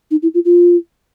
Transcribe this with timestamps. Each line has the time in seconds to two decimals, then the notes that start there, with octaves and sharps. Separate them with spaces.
0.11 D#4
0.22 E4
0.34 F4
0.45 F4